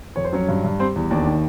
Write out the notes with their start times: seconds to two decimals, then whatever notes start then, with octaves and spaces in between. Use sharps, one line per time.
0.16 F2 C#5
0.25 C5
0.33 F#3 C#4 C#5
0.48 G2
0.64 G2
0.79 G3 C4 C5
0.96 E2
1.11 D#2 D4 D5
1.27 D#3